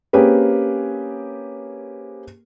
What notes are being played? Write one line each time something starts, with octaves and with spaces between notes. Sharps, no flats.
A#3 C4 C#4 G4 G#4 B4